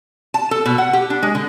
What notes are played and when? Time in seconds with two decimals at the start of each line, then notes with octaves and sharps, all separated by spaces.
0.34 A5
0.51 A4
0.65 B2
0.78 F#5
0.93 G4
1.10 D4
1.23 G#3
1.35 D3